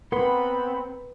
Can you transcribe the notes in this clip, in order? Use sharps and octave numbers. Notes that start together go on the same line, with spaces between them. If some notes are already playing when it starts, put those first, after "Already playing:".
B3 C4 A#4 B4 F#5 B5 C6